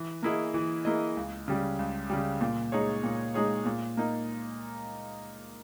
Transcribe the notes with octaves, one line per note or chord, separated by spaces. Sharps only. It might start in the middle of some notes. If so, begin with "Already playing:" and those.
Already playing: E3
A#3 E4 G#4 D#5
E3
A#3 E4 G#4 D#5
C#2
C#3 G3
C#2
C#3 G3
A#2
G#3 D#4 G#4 C#5
A#2
G#3 D#4 G#4 C#5
A#2
A#3 D#4